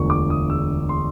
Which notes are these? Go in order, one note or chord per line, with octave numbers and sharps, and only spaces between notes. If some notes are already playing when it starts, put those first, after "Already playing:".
Already playing: E1 D2 D3 F3 C#6
D6
D#6
E6
C6